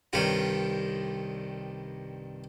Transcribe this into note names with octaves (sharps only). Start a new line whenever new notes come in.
C2 G2 D#3 F4 C#5